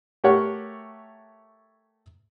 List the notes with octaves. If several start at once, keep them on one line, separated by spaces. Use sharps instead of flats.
A3 G4 A#4 C#5 F#5